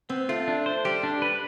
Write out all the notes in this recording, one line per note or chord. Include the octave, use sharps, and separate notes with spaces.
B3 C4
A3 F4
D4
C5
G3 G4
D4
B4